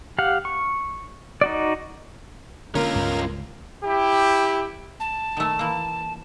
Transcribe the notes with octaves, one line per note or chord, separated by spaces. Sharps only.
G4 F5 F#5
C#6
D#4 F#4 D5
D3 A3 A#3 C#4 F4 A#4
C#2 G2 B3
E4 G4
A5
D#3 A3
E3 A#3